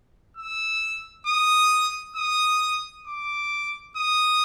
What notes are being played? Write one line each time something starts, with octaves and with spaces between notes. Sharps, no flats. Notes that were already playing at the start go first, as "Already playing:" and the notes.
E6
D#6
D#6
D6
D#6